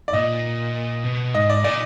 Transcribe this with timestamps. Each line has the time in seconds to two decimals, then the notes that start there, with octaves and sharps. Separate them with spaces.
0.08 D5
0.13 A#2 D#5
1.04 B2
1.34 G#2 D#5
1.50 D5
1.64 A#2 D5